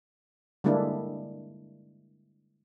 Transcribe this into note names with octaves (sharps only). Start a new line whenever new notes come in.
D3 G3 G#3 A#3 D4 E4